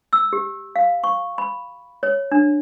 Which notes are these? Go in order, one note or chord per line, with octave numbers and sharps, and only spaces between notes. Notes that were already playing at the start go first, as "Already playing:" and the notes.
E6
G4
F5
C#6
B5
C#5
D4